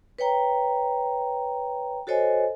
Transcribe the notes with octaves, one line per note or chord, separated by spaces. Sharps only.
B4 C#5 G5 A#5
F#4 A4 C5 C#5 D#5 G#5